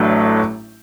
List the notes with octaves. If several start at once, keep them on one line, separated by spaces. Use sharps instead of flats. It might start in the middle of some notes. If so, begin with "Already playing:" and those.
Already playing: A1 A2 F#3 A3 D4